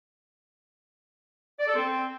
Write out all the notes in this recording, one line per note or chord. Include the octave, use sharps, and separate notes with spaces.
D5
A4
C4